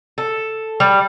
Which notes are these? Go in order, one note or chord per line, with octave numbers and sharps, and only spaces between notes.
A4
G3